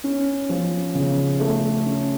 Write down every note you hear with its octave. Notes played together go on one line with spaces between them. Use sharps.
C#4
F3
C#3
A3
C#4